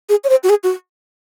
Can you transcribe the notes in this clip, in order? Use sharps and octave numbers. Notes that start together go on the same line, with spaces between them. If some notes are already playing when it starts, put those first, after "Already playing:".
G#4
C#5
C5
F#4
G#4
F#4